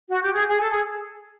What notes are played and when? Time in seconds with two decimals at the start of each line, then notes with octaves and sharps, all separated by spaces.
0.10 F#4
0.22 G4
0.34 G#4
0.47 G#4
0.60 A4
0.71 G#4